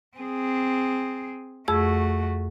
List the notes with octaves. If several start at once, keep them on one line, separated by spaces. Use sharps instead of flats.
C4 G#4
F2 A3 F#4 G#4 E6